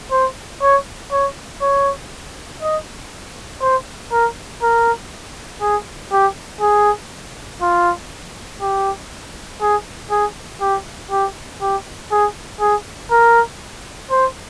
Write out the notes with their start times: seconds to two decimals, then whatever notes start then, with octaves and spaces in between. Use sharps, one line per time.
0.11 C5
0.62 C#5
1.12 C#5
1.62 C#5
2.62 D#5
3.61 C5
4.12 A#4
4.62 A#4
5.61 G#4
6.12 G4
6.61 G#4
7.62 F4
8.61 G4
9.61 G#4
10.11 G#4
10.61 G4
11.11 G4
11.61 G4
12.11 G#4
12.60 G#4
13.11 A#4
14.11 C5